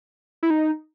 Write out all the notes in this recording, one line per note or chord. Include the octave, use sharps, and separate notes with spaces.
E4
D#4